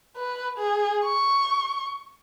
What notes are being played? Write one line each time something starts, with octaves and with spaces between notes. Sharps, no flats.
B4
G#4
C#6